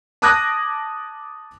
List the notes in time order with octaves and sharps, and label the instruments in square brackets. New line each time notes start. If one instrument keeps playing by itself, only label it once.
[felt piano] A5 D6 D#6 F#6 G#6 A#6